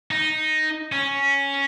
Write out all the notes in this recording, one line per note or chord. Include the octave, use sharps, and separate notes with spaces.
D#4
C#4